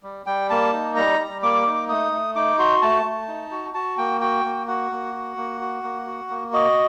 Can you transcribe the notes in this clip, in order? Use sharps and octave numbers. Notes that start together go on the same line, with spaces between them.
G3
G3 G5
A#3 A5
D#4
G3 A#5
G3
A#3 D6
D#4
A3 D#6
A3
D#4 D6
F#4 C6
A3 A5
A3
D#4
F#4
F#4 A5
A#3 G5
F#4 G5
A#3
F#4 F#5
A#3
F#4
A#3
F#4
A#3
F#4
A#3
F#4 D#5